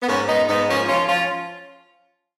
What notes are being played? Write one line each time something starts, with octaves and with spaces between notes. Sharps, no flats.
B3
G#2 A#3 C#4
G#2 B3 D#4
G#2 B3 D#4
F3 A#3 C#4
F3 C#4 F4
F3 C#4 F4